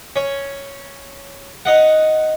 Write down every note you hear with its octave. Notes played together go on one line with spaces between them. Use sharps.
C#4
D#4 D#5 F#5